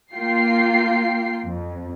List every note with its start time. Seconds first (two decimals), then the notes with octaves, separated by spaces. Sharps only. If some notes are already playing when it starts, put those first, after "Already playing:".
0.14 A#3 F4 G5 C7
1.45 F2